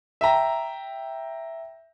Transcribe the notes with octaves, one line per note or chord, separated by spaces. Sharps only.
E5 G5 A#5